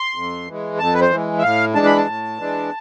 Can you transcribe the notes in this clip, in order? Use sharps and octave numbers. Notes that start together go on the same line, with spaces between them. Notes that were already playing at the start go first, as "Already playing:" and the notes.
Already playing: C6
F2
E3 G#3
F2 A5
B4
C5
E3 G#3
E5
A2 F5
E3 G#3 D4 A5
B5
A5
A2
E3 G#3 D4